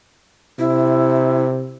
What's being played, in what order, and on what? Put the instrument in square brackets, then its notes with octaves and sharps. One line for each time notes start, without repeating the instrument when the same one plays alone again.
[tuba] C3 [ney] E4